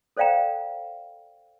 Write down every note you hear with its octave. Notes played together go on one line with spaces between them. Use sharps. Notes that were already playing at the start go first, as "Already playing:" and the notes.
A4 C5 D5 F5 G5 A#5